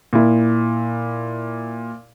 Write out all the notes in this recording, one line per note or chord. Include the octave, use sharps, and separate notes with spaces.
A#2 E4